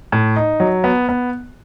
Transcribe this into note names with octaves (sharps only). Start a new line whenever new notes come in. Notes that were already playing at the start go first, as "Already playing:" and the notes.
A2
D#4
F#3
B3
B3